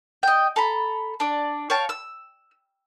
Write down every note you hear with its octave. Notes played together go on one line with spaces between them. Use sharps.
D#5 G5
A4 A#5 B5
D4 D5
C#5 F5 G5 A5
E6